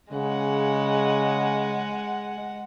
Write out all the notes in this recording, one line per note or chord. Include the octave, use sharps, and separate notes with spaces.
C#3 G#3 F#5